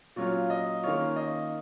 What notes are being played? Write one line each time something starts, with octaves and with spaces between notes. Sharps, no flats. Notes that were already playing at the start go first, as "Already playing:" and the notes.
A#2 F#3 C#4 F4 C#5
D#5
D#3 A#3 C#4 F4 C#5
D#5